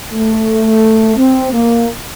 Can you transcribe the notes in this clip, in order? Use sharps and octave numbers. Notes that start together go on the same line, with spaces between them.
A3
C4
A#3